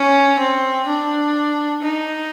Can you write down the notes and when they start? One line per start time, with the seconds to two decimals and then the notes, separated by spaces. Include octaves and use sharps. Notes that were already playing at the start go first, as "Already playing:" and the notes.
Already playing: C#4
0.39 C4
0.87 D4
1.82 D#4